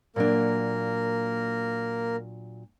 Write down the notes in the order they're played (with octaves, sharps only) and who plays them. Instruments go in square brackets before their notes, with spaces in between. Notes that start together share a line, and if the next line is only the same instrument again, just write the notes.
[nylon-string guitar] A#2 F#3 D4 [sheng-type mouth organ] A#3 A#4